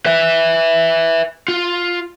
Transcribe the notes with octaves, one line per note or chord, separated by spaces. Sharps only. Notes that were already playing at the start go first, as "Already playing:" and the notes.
B4 E5
F4